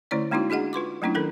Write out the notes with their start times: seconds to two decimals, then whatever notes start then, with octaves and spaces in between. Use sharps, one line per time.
0.11 D3 A3 C#4 E4 C#5 D5
0.31 G#3 A#3 C#4 D#4 E4 F#4
0.50 D4 F#4 G#4 D#5 F#5
0.73 F4 B4 C6 D6
1.02 F#3 A3 A#3 C#4 D4 E4
1.15 D#3 C#4 A4 A#4